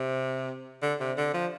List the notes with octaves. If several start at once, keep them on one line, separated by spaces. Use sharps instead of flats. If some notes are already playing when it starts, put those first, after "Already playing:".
Already playing: C3
D3
C3
D3
F3